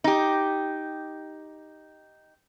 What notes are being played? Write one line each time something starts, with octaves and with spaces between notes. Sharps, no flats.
D#4 G4